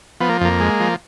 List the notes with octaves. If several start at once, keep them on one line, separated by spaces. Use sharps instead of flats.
F3 B3
A#3
F2 A#3
G#3
F3